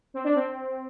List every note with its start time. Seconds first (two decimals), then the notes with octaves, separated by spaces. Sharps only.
0.14 C4
0.24 D4
0.35 C4